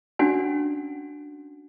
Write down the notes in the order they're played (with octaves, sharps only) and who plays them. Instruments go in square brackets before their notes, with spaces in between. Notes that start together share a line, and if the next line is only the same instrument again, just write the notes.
[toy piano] C#4 D4 F#4 F#5 G#5